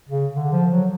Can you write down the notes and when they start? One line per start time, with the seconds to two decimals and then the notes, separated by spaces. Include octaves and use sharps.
0.09 C#3
0.35 D3
0.52 F3
0.71 F#3